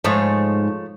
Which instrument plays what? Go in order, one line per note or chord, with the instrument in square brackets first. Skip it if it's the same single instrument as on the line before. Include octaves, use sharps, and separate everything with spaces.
[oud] G#2 [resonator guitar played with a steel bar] F3 A3 C#5